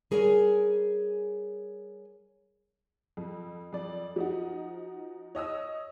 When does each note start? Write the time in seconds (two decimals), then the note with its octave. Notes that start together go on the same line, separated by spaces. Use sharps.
0.11 G3 G#4 A#4 C#5 E5 G#5
3.17 F2
3.73 F2 D5
4.16 F3 D#4 F#4
5.35 C#5 D#5 D#6 E6